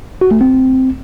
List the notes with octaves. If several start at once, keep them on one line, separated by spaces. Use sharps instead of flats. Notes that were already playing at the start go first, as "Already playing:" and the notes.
F#4
A3
C4